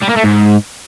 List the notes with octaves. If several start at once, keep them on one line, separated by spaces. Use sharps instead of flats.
G3
A#3
A3
G#2